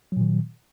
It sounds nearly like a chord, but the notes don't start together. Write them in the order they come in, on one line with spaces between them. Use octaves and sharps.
F#3 A#2 D#3